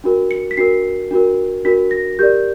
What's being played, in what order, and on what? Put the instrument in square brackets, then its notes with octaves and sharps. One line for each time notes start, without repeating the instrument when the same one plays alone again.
[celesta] D4 F#4 A#4
C#7
B6
D4 F#4 A#4 C7
D4 F#4 A#4
D4 F#4 A#4 B6
A#6
G4 A#4 D5 G6